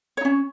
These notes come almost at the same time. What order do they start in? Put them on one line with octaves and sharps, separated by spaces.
C#5 D#4 C#4